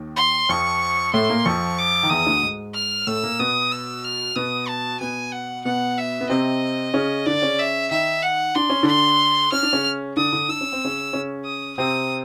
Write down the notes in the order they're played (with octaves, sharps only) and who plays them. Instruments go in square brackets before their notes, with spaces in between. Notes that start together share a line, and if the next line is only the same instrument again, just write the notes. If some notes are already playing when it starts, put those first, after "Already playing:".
Already playing: [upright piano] D#2 D#3
[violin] C6
[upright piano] F2 F3 [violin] C#6
[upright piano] A2 A3 [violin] C6
[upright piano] A#2 A#3
[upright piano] F2 F3 [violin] C#6
[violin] D6
[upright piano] D#3
[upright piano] E2 E3 [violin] D#6
[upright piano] D2 D3
G#2 G#3
[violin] F6
[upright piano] A2 A3 [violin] E6
[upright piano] A#2 A#3
[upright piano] B2 B3 [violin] D#6
[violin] E6
F6
[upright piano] B2 B3 [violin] D#6
[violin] A5
[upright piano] B2 B3 [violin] G#5
[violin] F#5
[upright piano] B2 B3 [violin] F#5
[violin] E5
[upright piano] B3
[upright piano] C3 C4 [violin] D#5
[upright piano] C#3 C#4
[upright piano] D3 D4 [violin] D5
[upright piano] C#3 C#4
[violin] E5
[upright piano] D#3 D#4 [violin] E5
[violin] F#5
[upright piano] D4 [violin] C6
[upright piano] C#4
[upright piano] D3 D4 [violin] C6
[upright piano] C#4 [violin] F6
[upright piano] D4
C#3 C#4
[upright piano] D3 D4 [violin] D#6
[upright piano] D3 D4
[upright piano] D4 [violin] E6
[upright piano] C#4
C4
C#3 C#4
C#3 C#4
[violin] D#6
[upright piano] C3 C4 [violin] D#6